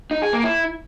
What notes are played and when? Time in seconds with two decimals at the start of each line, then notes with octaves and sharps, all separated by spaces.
0.11 D#4
0.22 G#4
0.33 A#3
0.44 E4